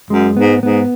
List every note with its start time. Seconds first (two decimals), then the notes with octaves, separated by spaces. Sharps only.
0.10 F#2 G#3
0.37 G#2 B3
0.63 G#2 B3